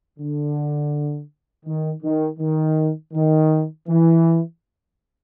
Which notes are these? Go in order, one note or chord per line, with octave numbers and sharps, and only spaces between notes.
D3
D#3
D#3
D#3
D#3
E3